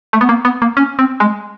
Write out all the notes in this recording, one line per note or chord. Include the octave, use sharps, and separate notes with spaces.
A3
B3
A#3
B3
A#3
C#4
C4
G#3